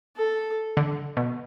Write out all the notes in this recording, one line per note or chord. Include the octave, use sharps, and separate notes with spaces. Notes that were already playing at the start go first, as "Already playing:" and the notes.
A4
D3
B2